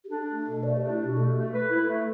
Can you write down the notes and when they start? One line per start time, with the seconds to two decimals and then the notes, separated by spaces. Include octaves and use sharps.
0.04 G4
0.09 D4 A4
0.28 A3
0.45 B2
0.63 A3 D5
0.77 D4 G4
0.90 E4
0.99 B2 G4
1.17 A3 A4
1.35 A3
1.53 B4
1.70 E4
1.88 A3